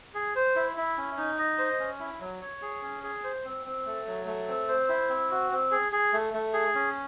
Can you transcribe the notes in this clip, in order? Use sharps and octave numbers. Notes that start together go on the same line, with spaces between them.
G#4
C5
E4
E4
C#4
D#4
D#5
C5
C#4
E4
F#3
C#5
G#4
C#4
G#4
C5
C4
C4
A3
F#3
A3
C4
C5
E4
C4
F#4
C4
G#4
G#4
A3
A3
G#4
C#4